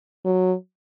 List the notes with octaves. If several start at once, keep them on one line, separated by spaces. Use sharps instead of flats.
F#3